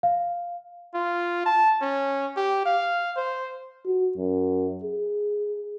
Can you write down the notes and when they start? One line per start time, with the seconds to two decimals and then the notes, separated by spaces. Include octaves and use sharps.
0.03 F5
0.94 F4
1.46 A5
1.81 C#4
2.36 G4
2.65 F5
3.16 C5
3.86 F#4
4.17 F#2
4.84 G#4